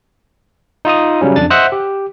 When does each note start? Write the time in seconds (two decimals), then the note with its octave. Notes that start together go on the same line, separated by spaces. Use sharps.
0.85 D#4 F4 D#5 D#6
1.21 C#3 F#3 G3 C#4
1.36 F2 D4 A6
1.50 C5 D#5 E5 F#5 F#6
1.72 G4